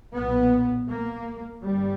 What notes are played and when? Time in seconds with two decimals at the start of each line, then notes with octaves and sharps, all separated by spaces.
0.14 B1 A#2 B3
0.88 A#3
1.62 G1 G2 G3